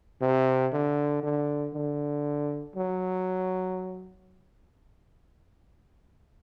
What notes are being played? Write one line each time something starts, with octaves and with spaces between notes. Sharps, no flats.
C3
D3
D3
D3
F#3